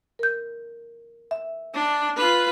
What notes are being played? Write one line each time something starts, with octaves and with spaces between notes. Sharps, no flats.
A#4 G6
E5
D4
F4 B4